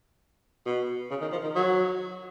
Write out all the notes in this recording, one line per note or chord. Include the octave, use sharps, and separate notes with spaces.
B2
C#3
D#3
F3
D#3
F#3